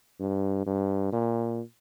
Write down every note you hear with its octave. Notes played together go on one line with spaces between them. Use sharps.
G2
G2
A#2